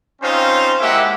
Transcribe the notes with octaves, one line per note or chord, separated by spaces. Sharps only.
C4 C#4 D#4 F4 C5
G#3 A#3 E4 G4 E5 F#5